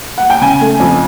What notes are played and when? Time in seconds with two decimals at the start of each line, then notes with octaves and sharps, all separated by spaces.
0.18 F#5
0.30 G5
0.41 C#3 G#5
0.61 A3
0.80 F2